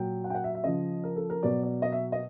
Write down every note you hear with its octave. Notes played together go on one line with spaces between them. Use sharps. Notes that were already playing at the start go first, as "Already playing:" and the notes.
Already playing: A#2 F#3 G5
F#5
G5
F#5
E5
E5
C#3 F3 D#5
A#4
A4
A#4
B2 F#3 D5
D5
D#5
E5
D#5